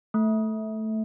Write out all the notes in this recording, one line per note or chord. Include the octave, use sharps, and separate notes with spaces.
A3